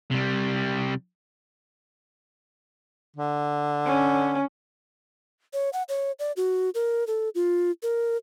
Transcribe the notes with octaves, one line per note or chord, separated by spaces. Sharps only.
C3 G3
D3
C#4
C#5
F#5
C#5
D5
F#4
A#4
A4
F4
A#4